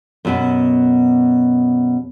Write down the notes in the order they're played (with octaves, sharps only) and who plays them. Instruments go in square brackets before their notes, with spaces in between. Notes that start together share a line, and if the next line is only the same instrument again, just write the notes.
[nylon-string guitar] F#2 B2 B3